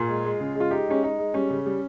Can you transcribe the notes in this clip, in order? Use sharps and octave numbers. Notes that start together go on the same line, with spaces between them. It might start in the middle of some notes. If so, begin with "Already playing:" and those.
Already playing: A#2 F4 G#4
G#3
G#3
C#3
G#3
F4
G#3 D#4 G4
G#3 C#4
G#3 D#4
G#3
G3 C#4
C#3
G3